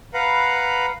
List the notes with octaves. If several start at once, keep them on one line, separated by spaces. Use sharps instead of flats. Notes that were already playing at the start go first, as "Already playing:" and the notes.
B4 F5 F#5 A#5 B5